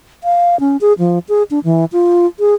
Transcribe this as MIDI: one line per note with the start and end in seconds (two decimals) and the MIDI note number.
0.24 0.59 77
0.60 0.77 61
0.81 0.93 68
0.99 1.19 53
1.29 1.43 68
1.51 1.59 62
1.64 1.85 52
1.92 2.26 65
2.40 2.54 68